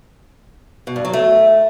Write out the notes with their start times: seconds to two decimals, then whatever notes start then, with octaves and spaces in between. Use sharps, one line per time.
0.87 B2
0.96 G2
1.05 F#3
1.13 A3